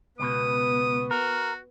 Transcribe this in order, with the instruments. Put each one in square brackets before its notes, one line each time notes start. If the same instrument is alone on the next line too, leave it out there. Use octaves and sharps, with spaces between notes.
[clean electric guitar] C#2 B2 [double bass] B3 [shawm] D#6
[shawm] F#4 [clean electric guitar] A#4